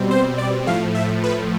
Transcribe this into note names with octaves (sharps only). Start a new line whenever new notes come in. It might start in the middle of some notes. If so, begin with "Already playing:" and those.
Already playing: B2 G3 C4
C5
D5
A2 F3 A3 F5
E5
B4